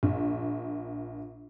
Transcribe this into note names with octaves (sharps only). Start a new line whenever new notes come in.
A#1